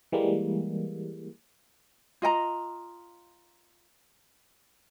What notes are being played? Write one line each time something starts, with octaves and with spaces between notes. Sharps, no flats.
E3 G3 G#3 A#3
F4 D#5 G5 A#5